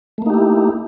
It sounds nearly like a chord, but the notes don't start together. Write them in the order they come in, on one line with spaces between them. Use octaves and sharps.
A3 A#3 D#4 G4 E4